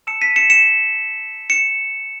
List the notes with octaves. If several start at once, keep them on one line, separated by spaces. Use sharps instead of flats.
A5 E6 C#7 E7
B6 D#7
C#7 E7
C#7 E7
C#7 E7